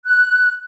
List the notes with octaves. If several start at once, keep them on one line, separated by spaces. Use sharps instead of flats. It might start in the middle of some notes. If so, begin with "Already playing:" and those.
F#6